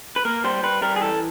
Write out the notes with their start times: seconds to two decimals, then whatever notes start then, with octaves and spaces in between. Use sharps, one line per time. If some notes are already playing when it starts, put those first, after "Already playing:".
0.16 B4
0.25 A#3 A#4
0.44 G3 C5
0.63 G3 B4
0.82 G3 A#4
0.96 G#4
1.01 E3 A4